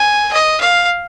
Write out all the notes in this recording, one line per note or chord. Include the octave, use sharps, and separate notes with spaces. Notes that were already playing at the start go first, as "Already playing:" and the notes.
Already playing: G#5
D#5
F5